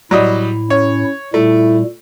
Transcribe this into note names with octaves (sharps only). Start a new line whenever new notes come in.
A2 F#3 G3 E4 D#5
C#4 C#5
A#2 G3 A3 E4